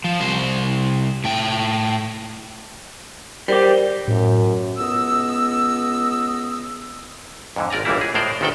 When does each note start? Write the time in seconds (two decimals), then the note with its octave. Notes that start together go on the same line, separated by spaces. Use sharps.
0.04 F3
0.20 C2 C5
1.24 A2 G5
3.48 G3 G4 A#4 C5
4.08 F#2 A2
4.78 C#2 B3 D#5 E6
7.56 F2 G#2 D3
7.70 G#1 A#4 D5 G#5 A#5
7.85 G1 C#2 E3 G3 A#3 E4
8.01 G#4
8.14 A2 G#3 A#4 C5 D5
8.41 G1 D2 D#3 A4 D5 G5